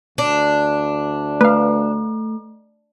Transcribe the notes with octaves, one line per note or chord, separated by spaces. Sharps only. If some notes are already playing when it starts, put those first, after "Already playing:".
D2 D4
A3 B4 F5